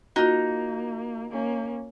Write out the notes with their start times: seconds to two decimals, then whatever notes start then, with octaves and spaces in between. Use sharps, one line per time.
0.16 A#3 D#4 F4 F#4
1.31 A#3 C#4